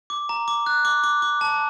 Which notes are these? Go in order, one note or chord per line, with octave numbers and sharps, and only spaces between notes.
D6
A#5
D6
F#6
D6
D6
D6
A5